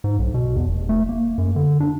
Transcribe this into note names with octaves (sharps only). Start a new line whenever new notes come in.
G#2
B1
B2
E2
F1
A3
A#3
F#2
D3
D4